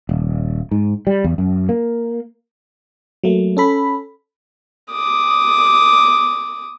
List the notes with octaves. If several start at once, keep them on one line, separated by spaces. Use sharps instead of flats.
D#1
G#2
G3
E2
F#2
A#3
F#3 A3 A#3
C#4 A4 B5
D6 D#6